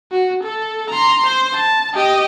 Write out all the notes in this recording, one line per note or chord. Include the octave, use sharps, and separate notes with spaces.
F#4
A4
A#5 C6
C5
A5
G4 D#5